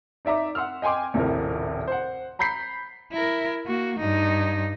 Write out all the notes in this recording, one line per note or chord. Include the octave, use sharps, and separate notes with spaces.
D#4 D5 E5 A#5 D6
F#5 C6 E6 F6
D#5 G5 G#5 C6 D6
D#1 A#1 A2 C3 A#4
C5 F#5
A#5 B5 G6 B6 C7
E4 A#4
A#3 F#4
G2 D#4